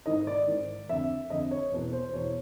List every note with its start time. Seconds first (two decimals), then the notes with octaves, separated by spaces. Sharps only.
0.06 G#2 D#3 D#5
0.27 D5
0.47 G#2 D#3
0.89 F2 D3 E5
1.30 F2 D3 D#5
1.51 C#5
1.72 E2 B2
1.93 C5
2.13 E2 B2 C#5